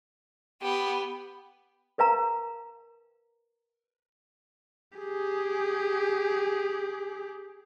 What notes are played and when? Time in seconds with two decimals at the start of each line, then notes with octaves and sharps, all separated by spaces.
0.62 B3 G4
1.98 A#4 B4 F5 A#5
4.98 G4 G#4